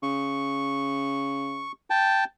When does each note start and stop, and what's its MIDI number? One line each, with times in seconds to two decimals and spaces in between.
0.03 1.66 49
0.03 1.72 85
1.90 2.24 79
1.90 2.24 81